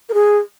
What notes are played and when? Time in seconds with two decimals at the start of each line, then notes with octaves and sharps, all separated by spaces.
0.09 A#4
0.14 G#4